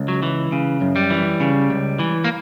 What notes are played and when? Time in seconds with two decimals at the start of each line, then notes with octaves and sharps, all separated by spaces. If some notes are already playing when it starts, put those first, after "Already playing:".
Already playing: C#2
0.08 F#3
0.23 E3
0.52 C#3
0.81 F#2
0.96 G3
1.10 E3
1.40 C#3
1.70 C#2
1.99 E3
2.24 A#3